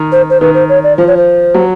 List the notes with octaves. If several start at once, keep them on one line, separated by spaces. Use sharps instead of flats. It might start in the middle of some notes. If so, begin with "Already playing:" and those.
Already playing: D#3
C5
C5
D#3 B4
C5
C#5
D5
F3 C5
C#5
C5
F#3